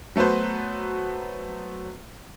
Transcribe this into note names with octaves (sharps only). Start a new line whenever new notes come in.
F#3 A3 B3 B4 C5